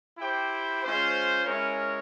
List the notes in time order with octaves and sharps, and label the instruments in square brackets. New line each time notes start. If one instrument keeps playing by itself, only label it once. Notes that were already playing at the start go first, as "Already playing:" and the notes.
[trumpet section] E4 G4 C5 G5
G#3 C#4 F4 C5
G#3 C#4 E4 A#4 C#5